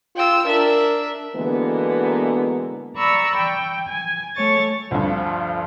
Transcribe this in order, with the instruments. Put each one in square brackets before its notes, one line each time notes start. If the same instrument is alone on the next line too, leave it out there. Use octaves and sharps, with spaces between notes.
[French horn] F4 [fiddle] G5 E6
[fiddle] D4 E5 [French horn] A#4
[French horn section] B2 D3 E3 G#3 A#3 B3
[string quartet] D5 A#5 B5 C#6 E6
G5
G#5
A3 C#5 C#6 A6
[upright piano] D2 G2 [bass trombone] F3